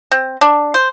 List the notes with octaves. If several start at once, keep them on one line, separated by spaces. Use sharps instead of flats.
C4
D4
C5